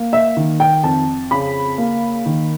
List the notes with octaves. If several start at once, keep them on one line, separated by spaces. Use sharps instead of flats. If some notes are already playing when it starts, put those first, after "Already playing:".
Already playing: A#3
E5
D#3
G5
F2 A5
C#3 B5
A#3
D#3